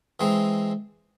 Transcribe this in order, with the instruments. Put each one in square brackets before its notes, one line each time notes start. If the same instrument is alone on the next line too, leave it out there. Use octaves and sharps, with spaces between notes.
[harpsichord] E3 G#3 C4 D#4